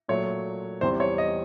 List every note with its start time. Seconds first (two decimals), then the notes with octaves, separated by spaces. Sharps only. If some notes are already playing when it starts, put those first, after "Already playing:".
0.08 A#2 F#3 A3 C#5
0.81 E2 C3 E3 G3 C5
1.00 C#5
1.18 D#5